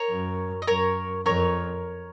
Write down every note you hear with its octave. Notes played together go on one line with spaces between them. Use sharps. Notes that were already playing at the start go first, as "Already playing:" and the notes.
Already playing: A#4 C#5
F#2
D#5
F#2 A#4 C#5
F2 A#4 C#5